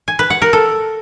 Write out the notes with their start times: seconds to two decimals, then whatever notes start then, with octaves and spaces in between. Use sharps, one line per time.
0.08 G#5
0.19 B4
0.30 F#5
0.42 A#4
0.53 A4